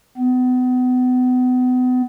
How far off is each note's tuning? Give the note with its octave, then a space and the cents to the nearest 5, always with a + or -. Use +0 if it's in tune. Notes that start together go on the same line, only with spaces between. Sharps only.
B3 +35